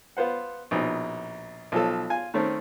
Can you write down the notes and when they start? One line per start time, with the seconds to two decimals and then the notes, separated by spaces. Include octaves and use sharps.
0.17 B3 F4 C5 F#5
0.71 A#1 B2 D#4
1.72 B1 F3 A4
2.10 F4 G#5
2.34 D#3 A3 C4 C#4